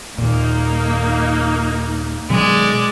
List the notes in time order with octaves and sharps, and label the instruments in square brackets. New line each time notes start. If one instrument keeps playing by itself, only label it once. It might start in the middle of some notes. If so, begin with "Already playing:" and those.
[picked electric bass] D#2 A#2 [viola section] A#3 D#4
[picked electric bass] B2 D#3 F#3 [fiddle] G#3 D5